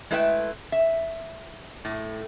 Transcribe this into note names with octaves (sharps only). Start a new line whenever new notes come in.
G#3 A3 E4 B4 E5 G5
E5
A2